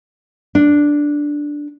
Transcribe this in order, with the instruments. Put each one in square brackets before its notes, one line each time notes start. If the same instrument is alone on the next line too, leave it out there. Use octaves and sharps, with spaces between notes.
[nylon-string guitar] D4